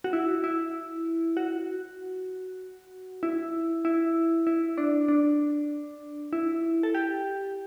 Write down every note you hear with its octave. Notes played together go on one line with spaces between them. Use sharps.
F#4
E4
E4
F#4
E4
E4
E4
D4
D4
E4
A4
G4